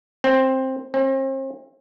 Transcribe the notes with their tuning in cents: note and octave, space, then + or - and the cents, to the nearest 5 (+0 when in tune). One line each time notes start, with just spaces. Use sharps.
C4 +10
C4 +40